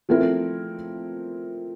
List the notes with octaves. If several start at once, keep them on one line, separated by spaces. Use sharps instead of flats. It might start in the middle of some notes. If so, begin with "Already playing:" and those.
F3 A3 C4 E4 A#4